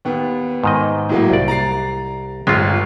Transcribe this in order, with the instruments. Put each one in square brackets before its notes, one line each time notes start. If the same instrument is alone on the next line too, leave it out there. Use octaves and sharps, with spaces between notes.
[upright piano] D#2 B3
[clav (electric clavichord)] G#2 D#3 D#5
[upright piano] A2 F#3 A#3
[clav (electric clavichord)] C2 D5
[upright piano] A#5 A6 C7
[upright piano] G1 [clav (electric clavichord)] G#3 C4 F4